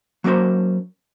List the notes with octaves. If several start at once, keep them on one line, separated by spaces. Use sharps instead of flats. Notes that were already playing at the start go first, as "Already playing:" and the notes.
F#3 A#3 C#4 A#4 C5